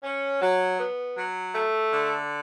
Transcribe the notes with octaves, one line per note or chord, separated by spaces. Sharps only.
C#4
F#3
B3
F#3
A3
D3